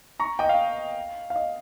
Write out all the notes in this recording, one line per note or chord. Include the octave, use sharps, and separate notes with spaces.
A#5 C#6
D#5 G5
F5
F5
D#5